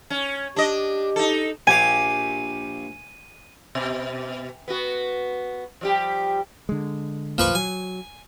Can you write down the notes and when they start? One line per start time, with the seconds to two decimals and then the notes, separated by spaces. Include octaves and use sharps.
0.10 C#4
0.56 D4 G4 D#5
1.16 D#4 A4
1.67 A#1 G4 F5 G#5 D#7
3.75 B2
4.68 B3 F#4
5.81 F3 G3 G4
6.69 D3 G#3
7.38 B1 F2 F3 A#3 B4 C#6
7.55 F#3 G#5